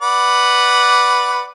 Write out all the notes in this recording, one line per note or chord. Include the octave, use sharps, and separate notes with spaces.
B4 D5 F#5